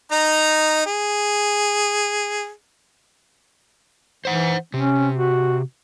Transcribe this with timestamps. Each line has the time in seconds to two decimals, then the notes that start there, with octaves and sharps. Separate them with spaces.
0.12 D#4 A#5
0.86 G#4
4.25 E3 C5 F#5
4.74 C3 C#4
5.15 F#4